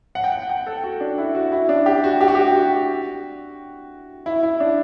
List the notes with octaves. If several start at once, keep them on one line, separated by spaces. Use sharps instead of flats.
F#5
G5
F#5
G5
A4
F#4
D4
E4
F#4
E4
D4
G4
F#4
G4
F#4
G4
F#4
E4
E4
D4